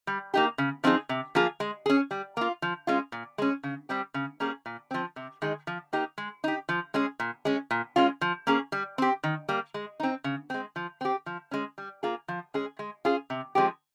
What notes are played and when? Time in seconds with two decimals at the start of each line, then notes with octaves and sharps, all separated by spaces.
0.07 G3
0.34 A#3 D#4 G4
0.58 C#3
0.84 F3 C4 D#4 G#4
1.09 C3
1.35 F3 A#3 F4 G#4
1.60 G#3
1.86 C#4 G#4
2.11 G3
2.37 A#3 F4
2.62 F3
2.87 G#3 C#4 F4
3.12 A#2
3.38 G#3 C#4
3.63 C#3
3.89 G3 C4 G4
4.14 C#3
4.40 G3 A#3 C#4 G#4
4.66 A#2
4.91 F3 C4
5.16 C3
5.42 D#3 G#3 D#4 G#4
5.67 F3
5.93 A#3 D#4 G4
6.18 G#3
6.44 D#4 G4
6.69 F3
6.94 G#3 C#4 G#4
7.20 A#2
7.45 G#3 C#4
7.71 A#2
7.96 G#3 C#4 F4
8.21 F3
8.47 A#3 C#4 G#4
8.72 G3
8.98 C4 G4
9.23 D#3
9.49 G3 A#3
9.74 G#3
10.00 C4 D#4
10.24 C#3
10.50 G#3 C4
10.76 F3
11.01 C4 G4
11.26 F3
11.51 G#3 C#4
11.78 G3
12.03 A#3 F4 G#4
12.28 F3
12.54 G#3 C#4 G#4
12.79 G#3
13.05 C#4 F4 G#4
13.30 C3
13.55 F3 G#3 C4 G4